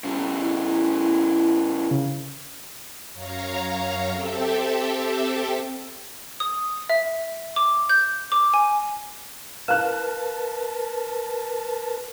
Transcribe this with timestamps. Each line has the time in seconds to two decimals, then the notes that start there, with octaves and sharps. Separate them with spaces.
0.04 C#3 G3
0.40 E4
1.91 C#3
3.13 F#2 C#5 F5 A#5
4.12 C4 G4 A4 E5
6.40 D#6
6.89 E5
7.56 D6
7.89 G6
8.32 D6
8.54 G#5
9.68 A#4 B4 F5 A5 F#6